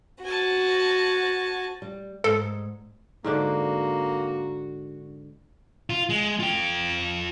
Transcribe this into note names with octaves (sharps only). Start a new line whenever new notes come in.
F#4 G#5 A5
G3
G#2 A4
G#2 D3 A#3 D4 F#4
F4
G#3
F4 G5